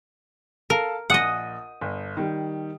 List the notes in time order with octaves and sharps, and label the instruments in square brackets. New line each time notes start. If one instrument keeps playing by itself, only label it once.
[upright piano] A4 F5 A5 [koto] A#4
[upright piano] A#1 D#6 D#7 [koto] D#5 F#5
[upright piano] G1
D#3 G3